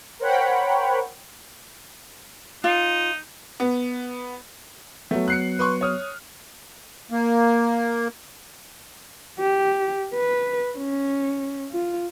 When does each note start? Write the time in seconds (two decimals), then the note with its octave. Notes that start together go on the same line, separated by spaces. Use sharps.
0.20 A#4 C5 C#5 F#5 G5 B5
2.64 D#4 F4
3.60 B3
5.11 F#3 A3 B3
5.28 F#6 C7 C#7
5.59 B4 C6 C#6
5.81 C#5 D#6 F6
7.10 A#3
9.40 G4
10.15 B4
10.77 C#4
11.72 F4